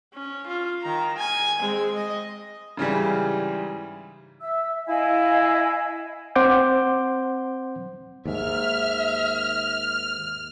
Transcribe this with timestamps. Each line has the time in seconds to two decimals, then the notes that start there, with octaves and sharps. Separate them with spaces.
0.14 C#4
0.47 F4
0.81 D#3 A#5
1.17 G#5
1.59 G#3 C4
1.93 D#5
2.77 G#2 C#3 E3 G3
4.41 E5 E6
4.88 E4 D#5 F5 G#5
6.36 C4 C5 F#5 C6 D6 G6
8.25 D#2 G#2 E5 F6